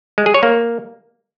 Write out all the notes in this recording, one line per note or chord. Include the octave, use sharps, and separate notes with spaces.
G#3
G#4
C#5
A#3